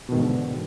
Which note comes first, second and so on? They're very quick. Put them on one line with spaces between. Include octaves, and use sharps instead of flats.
B2 D#3 G#2 E2 D3